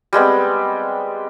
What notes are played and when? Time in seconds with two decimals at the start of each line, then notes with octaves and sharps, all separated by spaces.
0.13 G3 G#3 B3 C4